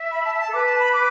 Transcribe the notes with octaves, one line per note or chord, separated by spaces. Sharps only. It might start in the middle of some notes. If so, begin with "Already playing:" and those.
Already playing: E5
B5
A5
A5
A4
B4 D6
A5
B5
D6